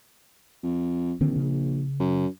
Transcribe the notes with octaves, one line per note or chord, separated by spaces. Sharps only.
F2
A#1 D3 D#3 C4
C#3
F#2